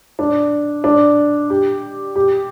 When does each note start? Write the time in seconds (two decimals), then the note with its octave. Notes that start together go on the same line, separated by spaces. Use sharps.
0.19 D4
0.84 D4
1.50 G4
2.16 G4